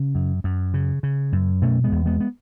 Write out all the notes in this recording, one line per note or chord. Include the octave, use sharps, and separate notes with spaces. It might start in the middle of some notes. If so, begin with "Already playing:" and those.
Already playing: C#3
F#2
F#2
C#3
C#3
F#2
B2 A3 C#4
G#3 B3
E2
G#3 B3
B3